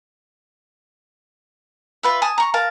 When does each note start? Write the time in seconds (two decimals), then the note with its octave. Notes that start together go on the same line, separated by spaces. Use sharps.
2.03 F4 B4 E5
2.22 G#5 A5 D#6
2.38 A#5 C#6
2.54 A#4 F5 A5